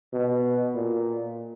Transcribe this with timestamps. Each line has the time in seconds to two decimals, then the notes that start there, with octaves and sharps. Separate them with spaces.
0.13 B2
0.75 A#2